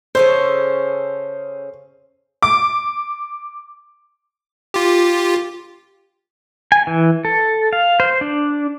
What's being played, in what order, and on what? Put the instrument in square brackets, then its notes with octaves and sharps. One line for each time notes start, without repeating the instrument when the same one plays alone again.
[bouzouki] C#3 C#4 A4 [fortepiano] C5
[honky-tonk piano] D6
[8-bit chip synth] F4 G4
[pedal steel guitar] G#5
E3
A4
F5
C5
D4